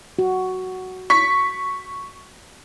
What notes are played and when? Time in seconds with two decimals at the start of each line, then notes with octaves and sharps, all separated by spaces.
0.19 F#4
1.10 C#6 B6